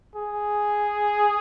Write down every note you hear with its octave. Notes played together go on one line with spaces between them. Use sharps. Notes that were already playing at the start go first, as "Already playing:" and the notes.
G#4